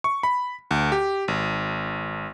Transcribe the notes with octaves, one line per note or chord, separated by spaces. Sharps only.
C#6
B5
D2
G4
G#1